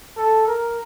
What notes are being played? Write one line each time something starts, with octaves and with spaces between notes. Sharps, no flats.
A4
A#4